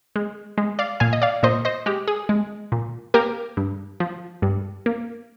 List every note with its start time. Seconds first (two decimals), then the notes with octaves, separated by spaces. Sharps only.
0.16 G#3
0.58 G#3
0.79 D5 F5
1.00 A#2 F5 G#5
1.13 D#5
1.22 D5 F5
1.43 A#2 C5 D#5
1.65 C5 D#5
1.86 G#3 G4
2.08 G#4
2.29 G#3
2.72 A#2
3.14 A#3 G4 A#4
3.57 G2
4.00 F3
4.42 G2
4.86 A#3